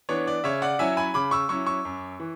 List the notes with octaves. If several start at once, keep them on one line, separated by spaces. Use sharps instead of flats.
E3 B3 D4 C#5
D5
C#3 C#5 E5
D5 F#5
F#3 C#4 E4 E5 G#5
G#5 B5
C#3 B5 D6
C#6 E6
F#3 C#4 E4 C#6 E6
C#6 E6
F#2
E3